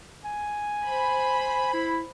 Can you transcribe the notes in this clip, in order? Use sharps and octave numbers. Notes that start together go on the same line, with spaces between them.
G#5
C5 B5
E4